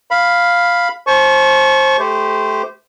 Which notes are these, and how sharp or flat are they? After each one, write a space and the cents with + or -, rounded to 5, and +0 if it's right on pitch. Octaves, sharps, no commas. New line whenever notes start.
F5 +0 B5 +0
C5 +25 A5 -35 C#6 +0
A3 -20 G4 +0 C5 -25